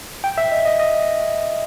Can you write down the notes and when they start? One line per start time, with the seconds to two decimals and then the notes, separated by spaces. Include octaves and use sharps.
0.24 G5
0.38 E5
0.51 D#5
0.65 D#5
0.80 D#5